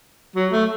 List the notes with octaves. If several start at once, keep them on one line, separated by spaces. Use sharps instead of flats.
F#3
A3